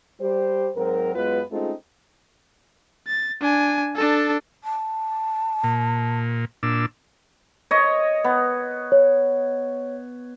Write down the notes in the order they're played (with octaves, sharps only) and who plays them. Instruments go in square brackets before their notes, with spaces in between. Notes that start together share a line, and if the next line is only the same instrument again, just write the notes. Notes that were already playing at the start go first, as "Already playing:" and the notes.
[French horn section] G3 G4 C5
G#2 F#3 C4 A#4
F#2 G#3 B3 F4 B4
G#3 A3 C4 C#4 D#4 F4
[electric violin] A6
D4 G#5
D4 A4
[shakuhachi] A5
[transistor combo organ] A#2
A#2 D4 E6
[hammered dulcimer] C#5 D#5
B3
[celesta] C#5